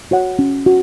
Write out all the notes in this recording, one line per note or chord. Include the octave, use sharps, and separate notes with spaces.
F#4 C#5 F#5
C#4
F#4